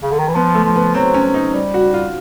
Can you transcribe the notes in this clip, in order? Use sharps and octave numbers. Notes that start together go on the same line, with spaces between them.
C#3
D3
D#3
E3
F3 B3
A3
F3
B3
F#3 C4
C#4
F#3
D#4
G3
F#4
F4